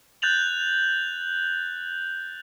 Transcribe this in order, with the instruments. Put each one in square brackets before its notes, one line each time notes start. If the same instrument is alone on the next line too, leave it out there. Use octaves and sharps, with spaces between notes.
[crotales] F#6 G6 A6 F7 F#7